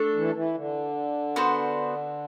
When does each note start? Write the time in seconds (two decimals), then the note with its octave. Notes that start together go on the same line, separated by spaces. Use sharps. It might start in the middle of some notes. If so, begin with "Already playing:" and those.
Already playing: A3 D4 A4
0.14 E3
0.34 E3
0.55 D3
1.36 B3 F#4 C5